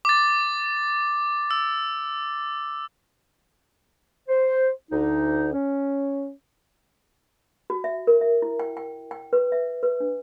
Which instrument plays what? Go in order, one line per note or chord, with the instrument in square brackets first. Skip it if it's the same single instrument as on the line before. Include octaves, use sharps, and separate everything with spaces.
[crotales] D6 A6
E6
[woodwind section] C5
D2 D#4
C#4
[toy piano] F#4
E5
A#4
E5
E4
G5
G5
G5
B4
E5
B4
D4